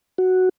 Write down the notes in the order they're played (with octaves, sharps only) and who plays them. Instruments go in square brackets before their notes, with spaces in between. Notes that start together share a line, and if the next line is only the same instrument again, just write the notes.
[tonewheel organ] F#4